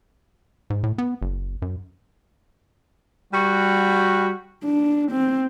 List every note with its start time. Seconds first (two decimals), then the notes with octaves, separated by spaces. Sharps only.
0.70 G#2
0.83 A2
0.98 B3
1.22 F#1
1.62 F#2
3.33 G3 F#4
4.64 D4
5.12 C4